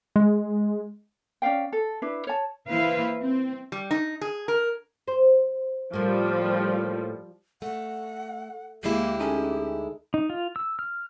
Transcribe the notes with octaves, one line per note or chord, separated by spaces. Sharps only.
G#3
C#4 D5 F5 G5
A4
D4 E4 B4
C#5 A5
E3 A#3 E4 B4 C5 F5
C4
G3
D#4
G#4
A#4
C5
A2 F3 G3 A#3
A3 F#5
D2 G#3 A#3 E4 G4
C#4 D#4 G#4 A4
D#4
F4
E6
F6